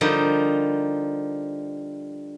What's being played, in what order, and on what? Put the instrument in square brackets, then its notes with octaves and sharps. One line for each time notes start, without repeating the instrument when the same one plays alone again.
[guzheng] D3 F3 G3 D#4 A#4